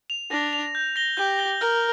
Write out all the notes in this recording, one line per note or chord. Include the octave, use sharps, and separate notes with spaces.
F7
D4 A#6
F7
G6
A#6 G7
G4 G6
A#6 G7
A#4 F6